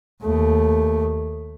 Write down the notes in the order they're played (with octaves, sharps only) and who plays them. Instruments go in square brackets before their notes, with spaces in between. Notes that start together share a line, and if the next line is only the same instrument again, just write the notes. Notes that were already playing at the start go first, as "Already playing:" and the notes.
[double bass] D#2 A3